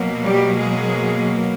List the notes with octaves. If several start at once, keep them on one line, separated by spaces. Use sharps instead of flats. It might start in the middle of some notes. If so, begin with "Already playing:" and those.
Already playing: B2 F#3 A#3
G3 G4
G#3 G#4